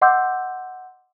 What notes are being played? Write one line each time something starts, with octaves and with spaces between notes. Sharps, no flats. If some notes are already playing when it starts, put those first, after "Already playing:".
D#5 F#5 C6 D6 E6 G6